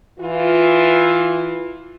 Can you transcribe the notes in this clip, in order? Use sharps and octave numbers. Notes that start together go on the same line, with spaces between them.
E3 F4